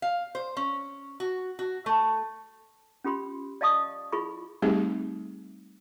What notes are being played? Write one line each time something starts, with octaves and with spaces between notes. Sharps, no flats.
F5
C5
C#4
F#4
F#4
A3
C#4 F4 G4 B5 C6
D5 D#5 F5 A5 C#6 D#6
E4 F4 G#4 B5 C#6
G3 A3 C4 D#4 G4 G#4